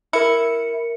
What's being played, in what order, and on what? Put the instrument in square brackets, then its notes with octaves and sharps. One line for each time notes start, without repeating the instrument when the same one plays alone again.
[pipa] E4 [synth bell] A#4 C#7